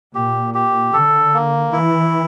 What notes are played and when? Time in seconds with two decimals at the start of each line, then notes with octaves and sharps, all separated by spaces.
0.14 A#2 G4
0.54 G4
0.93 D3 A4
1.34 A#3
1.72 E3 E4